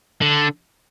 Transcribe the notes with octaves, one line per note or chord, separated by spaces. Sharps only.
D3